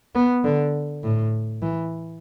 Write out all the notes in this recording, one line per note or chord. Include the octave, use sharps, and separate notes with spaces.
B3
D3
A2
E3